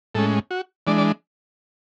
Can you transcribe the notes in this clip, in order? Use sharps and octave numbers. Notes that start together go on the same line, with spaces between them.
A2 G#3 C#4 A4
F#4
E3 G#3 D4 D5
D5